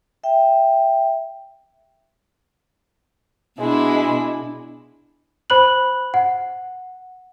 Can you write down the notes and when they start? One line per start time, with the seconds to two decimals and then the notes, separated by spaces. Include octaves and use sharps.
0.23 E5 G5
3.59 B2 G#3 D4 E4 B5
5.50 C5 B5 F#6 F#7
6.14 F#5